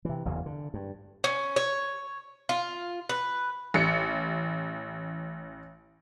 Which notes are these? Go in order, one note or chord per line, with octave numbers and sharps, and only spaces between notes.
C3 E3
F#1 E2 G2 E3
D3
G2
C#4
C#5
F4
B4
A1 C#7